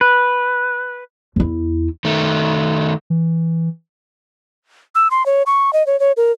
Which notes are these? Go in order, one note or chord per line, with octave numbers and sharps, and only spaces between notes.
B4
E2 E4
D#3 A3
E3
E6
C6
C#5
C#6
D#5
C#5
C#5
A#4